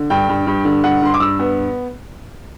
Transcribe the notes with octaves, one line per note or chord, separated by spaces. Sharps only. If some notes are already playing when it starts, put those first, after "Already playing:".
Already playing: D3
G2 G5
G2
G2
D3
G2 F#5
G2 C6
D6
G2 E6
B3